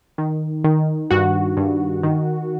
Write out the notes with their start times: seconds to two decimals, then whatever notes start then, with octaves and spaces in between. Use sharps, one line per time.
0.18 D#3
0.64 D#3
1.11 G2 F#4
1.57 G2
2.03 D#3